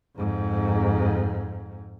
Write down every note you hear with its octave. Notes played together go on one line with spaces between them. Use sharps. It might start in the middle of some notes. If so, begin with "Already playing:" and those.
F2 G#2